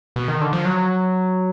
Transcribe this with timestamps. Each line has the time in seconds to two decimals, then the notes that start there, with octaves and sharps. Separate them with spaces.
0.16 B2
0.28 D#3
0.41 D3
0.53 F3
0.65 F#3